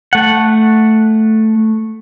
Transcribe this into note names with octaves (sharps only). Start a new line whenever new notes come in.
A3 F#5